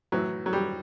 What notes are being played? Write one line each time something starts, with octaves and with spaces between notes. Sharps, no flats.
A2 E3 F#3
F#3
G3